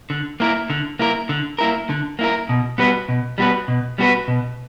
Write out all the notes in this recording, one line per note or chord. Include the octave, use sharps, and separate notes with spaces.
D3
A#3 E4 A#4
D3
A#3 E4 A#4
D3
A#3 E4 A#4
D3
A#3 E4 A#4
B2
G3 B3 F#4 B4
B2
G3 B3 F#4 B4
B2
G3 B3 F#4 B4
B2